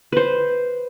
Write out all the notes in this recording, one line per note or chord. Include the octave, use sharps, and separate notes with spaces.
B4 C5